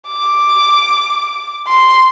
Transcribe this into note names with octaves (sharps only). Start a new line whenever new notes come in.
D6
C6